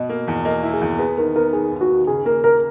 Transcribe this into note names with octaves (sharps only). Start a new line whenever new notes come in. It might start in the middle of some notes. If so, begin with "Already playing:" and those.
Already playing: B2 D#5
A#3
E2
A#3 D#5
E4
G#4
E2
B3 G#4
D#3 A#4
B3 A#4
D#3 G#4
D#2
F#4
D#3
C#3 G#4
A#3 A#4
A#3 A#4